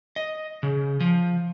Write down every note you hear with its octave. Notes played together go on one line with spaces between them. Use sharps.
D#5
C#3
F3